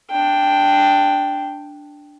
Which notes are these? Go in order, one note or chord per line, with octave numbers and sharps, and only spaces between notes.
D4 G5